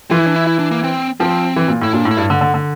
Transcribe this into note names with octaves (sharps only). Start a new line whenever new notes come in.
E3 F4
E4
D4
E4
E4
D4
A#3
C4
F3 C4
E3
A#2
A2 E4
A#2 D4
A2
E4
G2
D3
D3
D3